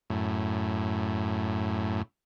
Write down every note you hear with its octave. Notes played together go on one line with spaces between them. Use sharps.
F#2 A2